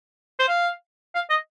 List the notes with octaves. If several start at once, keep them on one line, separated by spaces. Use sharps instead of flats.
C5
F5
F5
D#5